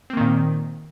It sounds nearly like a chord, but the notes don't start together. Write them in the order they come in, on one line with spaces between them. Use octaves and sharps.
C4 A#3 D#3 A#2